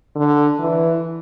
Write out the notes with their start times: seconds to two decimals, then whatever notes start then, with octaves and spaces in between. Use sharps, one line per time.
0.16 D3
0.59 E3